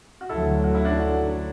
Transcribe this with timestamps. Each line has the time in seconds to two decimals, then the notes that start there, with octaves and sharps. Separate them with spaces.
0.21 F#4
0.29 D2 D3 F#3 E4 A4
0.64 F#4
0.75 E4
0.85 D4 F#4